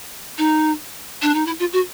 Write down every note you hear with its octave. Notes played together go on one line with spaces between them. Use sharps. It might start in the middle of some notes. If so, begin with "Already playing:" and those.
D#4
D4
D#4
E4
F4
F#4